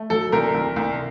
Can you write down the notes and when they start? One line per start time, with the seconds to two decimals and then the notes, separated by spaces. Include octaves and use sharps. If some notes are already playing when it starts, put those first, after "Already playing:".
Already playing: A3
0.10 F#3 A4
0.32 C2 A#4
0.54 C2
0.76 C2